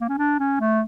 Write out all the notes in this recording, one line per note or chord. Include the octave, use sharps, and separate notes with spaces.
A#3
C#4
D4
C#4
A3